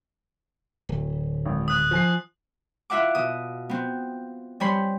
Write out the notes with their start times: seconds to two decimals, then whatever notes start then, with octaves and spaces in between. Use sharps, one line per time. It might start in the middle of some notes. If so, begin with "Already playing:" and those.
0.89 D1
1.45 G#1
1.68 D#6 F#6
1.91 F3 G#5 C7
2.90 E4 F4 E5 F#5 D6
3.15 B2 D#6
3.69 B3 C4
4.60 G3 C4 C#5 B5 C6